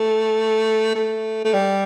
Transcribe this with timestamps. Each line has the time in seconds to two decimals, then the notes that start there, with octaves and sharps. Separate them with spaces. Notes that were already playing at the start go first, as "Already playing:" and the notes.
Already playing: A3
0.95 A3
1.45 A3
1.54 G3